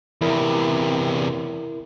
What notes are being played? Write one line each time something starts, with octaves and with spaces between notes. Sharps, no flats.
E2 C3 E4 A#4